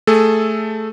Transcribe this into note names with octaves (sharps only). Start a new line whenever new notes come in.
A3 G#4 A4